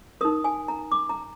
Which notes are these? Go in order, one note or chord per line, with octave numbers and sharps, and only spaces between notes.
D#4 A#4 D#6
G#5
A#5
D6
A#5